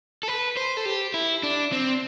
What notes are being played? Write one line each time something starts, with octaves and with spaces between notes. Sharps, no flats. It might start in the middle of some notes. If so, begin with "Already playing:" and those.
A4
B4
C5
A4
G4
E4
D4
C4